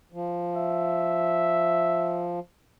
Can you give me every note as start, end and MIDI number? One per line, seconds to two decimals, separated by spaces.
0.12 2.39 53
0.56 2.30 76